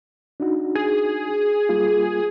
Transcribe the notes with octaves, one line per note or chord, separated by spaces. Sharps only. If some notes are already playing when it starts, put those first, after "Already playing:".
D4 D#4 F#4
G#4
G3 A#3 F4